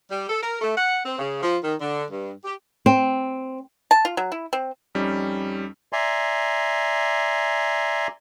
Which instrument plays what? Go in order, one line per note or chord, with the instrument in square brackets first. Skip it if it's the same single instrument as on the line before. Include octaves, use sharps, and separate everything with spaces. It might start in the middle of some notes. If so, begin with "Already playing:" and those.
[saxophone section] G3
A4
A#4
A3
F#5
C4
C#3
F3
D#3
D3
G2
G4
[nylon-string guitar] C4
[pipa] A5
F4
F#3
E4
C4
[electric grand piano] F2 G3 C#4 D#4
[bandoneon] D5 E5 G#5 A#5 C6